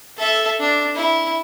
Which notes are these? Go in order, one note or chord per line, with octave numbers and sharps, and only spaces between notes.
A4 E5
D4
E4